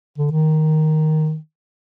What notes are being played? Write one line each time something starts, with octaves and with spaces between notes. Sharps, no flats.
D3
D#3